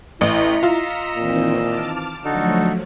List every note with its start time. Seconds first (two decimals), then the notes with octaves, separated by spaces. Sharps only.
0.21 A1 E4 A#5 B6 C#7
0.63 F4 D#5 E6
1.16 A#2 D#3 E3 C4
1.58 A5 D6 F6
2.24 D3 F3 F#3 A3 D#4 F#4 A4